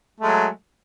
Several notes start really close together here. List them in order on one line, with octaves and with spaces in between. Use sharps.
A3 G#3 F#3